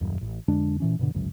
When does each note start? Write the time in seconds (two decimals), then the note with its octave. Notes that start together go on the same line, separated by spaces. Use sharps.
0.01 D#1 F#2
0.21 A1
0.48 F2 D3 G#3 D4
0.80 A#2 E3 C#4
0.99 G2 B2 D3
1.15 G1 C#2 F#2